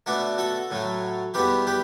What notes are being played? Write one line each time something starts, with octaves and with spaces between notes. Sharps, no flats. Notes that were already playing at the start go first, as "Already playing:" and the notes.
B2 A3 D4 F#4
F#4 A4
A2 F#3 A3
E2 B2 G3 B3 G4 B4
G4 B4